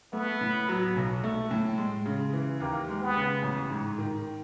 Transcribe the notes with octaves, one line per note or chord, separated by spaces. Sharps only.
A3 B3
A2
F#3
B1
A3
A2
G#3
C#3
E3
D#2 A#3
G#3
B3
C#3
A1
G#2
D#3